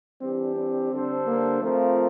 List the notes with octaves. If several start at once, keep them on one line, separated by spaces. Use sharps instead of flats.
E3 G3 C4 D4 G4
C4
D3 G3 D4 A4 C5
A#3
F3 A3 C4 F4 A#4